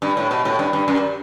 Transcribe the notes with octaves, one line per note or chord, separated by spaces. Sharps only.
G2
A2
B2
A2
G2
G2
F#2